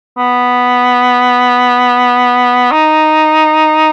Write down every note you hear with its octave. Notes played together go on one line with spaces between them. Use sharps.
B3
D#4